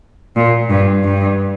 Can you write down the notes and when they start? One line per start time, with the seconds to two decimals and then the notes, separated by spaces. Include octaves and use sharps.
0.36 A#2
0.69 G2
1.04 G2